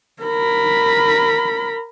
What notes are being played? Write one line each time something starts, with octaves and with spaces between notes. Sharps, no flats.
A#4 B5